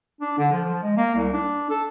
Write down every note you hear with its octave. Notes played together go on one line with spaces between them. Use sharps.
D4
D3
F3
F3
G#3
A#3
C2
D4
A4